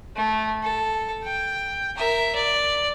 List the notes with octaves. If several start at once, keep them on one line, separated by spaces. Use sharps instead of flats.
A3
A4
G5
A#4 E5
D5